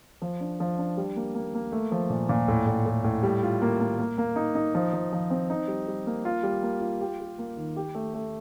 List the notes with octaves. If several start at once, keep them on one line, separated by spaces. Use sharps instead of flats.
F3
D4
F3
D4
G3
A#3
A#3
A#3
A3
F3
A#2
A#2
A2
A2
A2
A2
G3
F4
A#3
A#3
A#3
A#3
D#4
D#4
F3
F3
F3
C4
D#4
G3
G3
A#3
F4
G3
A#3
F4
G4
G4
A#3
D#3
G4
A3
A3